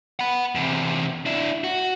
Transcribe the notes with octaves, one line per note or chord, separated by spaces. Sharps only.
F#5 B5
E2 C3
D4 E4
F#4